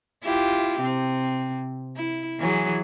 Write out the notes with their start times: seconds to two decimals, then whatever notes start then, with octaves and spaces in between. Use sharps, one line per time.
0.23 E4 F4 G4
0.80 C3 C4
1.96 E4
2.39 E3 F#3 G#4